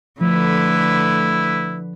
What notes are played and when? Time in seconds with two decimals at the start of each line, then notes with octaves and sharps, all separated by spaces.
0.21 D3 F3 A3 E4 B4